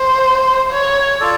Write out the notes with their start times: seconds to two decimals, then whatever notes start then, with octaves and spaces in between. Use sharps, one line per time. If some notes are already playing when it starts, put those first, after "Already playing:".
Already playing: C5
0.71 C#5
1.20 F4 A4 D5